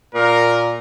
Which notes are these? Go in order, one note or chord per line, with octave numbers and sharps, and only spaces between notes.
A#2 A#4